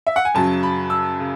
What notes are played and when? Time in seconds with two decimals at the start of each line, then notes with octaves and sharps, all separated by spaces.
0.07 E5
0.16 F#5
0.25 G#5
0.34 F#2 C#3 F#3 A5
0.63 B5
0.90 E6
1.20 C#3